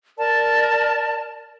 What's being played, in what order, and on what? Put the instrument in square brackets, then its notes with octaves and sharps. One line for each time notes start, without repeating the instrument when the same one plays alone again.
[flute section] A#4 D5 A5